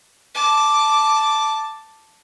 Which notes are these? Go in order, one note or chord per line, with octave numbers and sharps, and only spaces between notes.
A5 D6